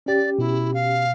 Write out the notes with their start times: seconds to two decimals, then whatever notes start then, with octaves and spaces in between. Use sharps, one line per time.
0.06 C#4 G4 D5
0.39 B2 E4
0.73 F5